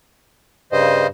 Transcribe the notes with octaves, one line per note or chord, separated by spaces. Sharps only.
G2 C#3 C5 D#5